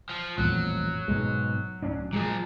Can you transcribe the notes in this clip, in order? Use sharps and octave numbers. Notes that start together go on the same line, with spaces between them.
F3
D#1 A1 F2 F#3
G#2 B2 G#3
D1 C#4 D4
A#2 F3 F#3 G#3